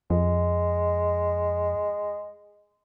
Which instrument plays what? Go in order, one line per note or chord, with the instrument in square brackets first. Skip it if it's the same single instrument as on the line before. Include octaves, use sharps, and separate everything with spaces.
[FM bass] F2 [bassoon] G#3